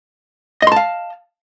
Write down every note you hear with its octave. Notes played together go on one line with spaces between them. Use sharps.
D#5 F5 A5 C6